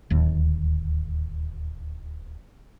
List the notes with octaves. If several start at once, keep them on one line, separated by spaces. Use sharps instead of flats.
D1 D#2